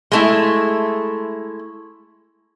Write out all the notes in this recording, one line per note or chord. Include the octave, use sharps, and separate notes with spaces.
G#3 A3 E4